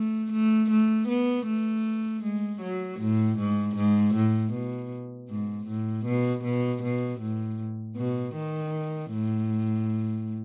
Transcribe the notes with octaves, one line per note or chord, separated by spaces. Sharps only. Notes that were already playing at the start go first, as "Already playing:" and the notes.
Already playing: A3
A3
A3
B3
A3
G#3
F#3
A2
G#2
G#2
A2
B2
G#2
A2
B2
B2
B2
A2
B2
D#3
A2